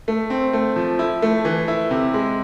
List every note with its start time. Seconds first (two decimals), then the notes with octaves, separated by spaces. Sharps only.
0.08 A3
0.30 C4
0.53 A3
0.76 F3
0.99 E4
1.22 A3
1.45 E3
1.68 E4
1.91 C3
2.14 G#3